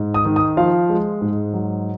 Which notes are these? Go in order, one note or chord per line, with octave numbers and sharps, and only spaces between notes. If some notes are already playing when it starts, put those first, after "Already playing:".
Already playing: G#2
D#6
D#3
D#6
F3 F5
G#3
G#2
F#3